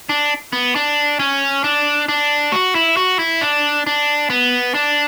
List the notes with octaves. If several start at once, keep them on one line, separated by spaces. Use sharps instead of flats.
D4
B3
D4
C#4
D4
D4
F#4
E4
F#4
E4
D4
D4
B3
D4